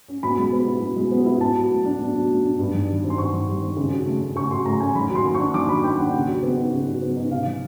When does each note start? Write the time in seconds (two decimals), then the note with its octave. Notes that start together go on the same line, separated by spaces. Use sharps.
0.08 C#4
0.23 B2 B5
0.38 G#3
0.52 B3
0.67 E4
0.82 B2
0.96 G#3
1.11 B3
1.26 E4
1.41 B2 A5
1.56 F#3
1.71 A3
1.85 D4
2.00 B2
2.15 F#3
2.30 A3
2.45 D4
2.59 G2
2.74 D#3
2.88 G3
3.04 C4
3.10 C6
3.18 G2 C#6
3.33 D#3
3.48 G3
3.63 C4
3.77 C#3
3.92 F#3
4.06 A3
4.21 C#4
4.36 C#3 C#6
4.51 F#3 C6
4.66 A3 A#5
4.80 C#4 G#5
4.95 D#3 B5
5.10 F#3
5.15 C6
5.24 A#3
5.35 C#6
5.39 D4
5.54 D#3 D6
5.69 F#3 B5
5.83 A#3 G5
5.98 D4 F#5
6.14 C#3
6.28 F#3
6.43 B3
6.57 D#4
6.72 C#3
6.87 F#3
7.02 B3
7.17 D#4
7.31 C3 F5
7.46 D#3